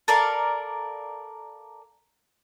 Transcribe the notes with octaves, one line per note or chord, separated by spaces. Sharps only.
A4 A#4 D5 F5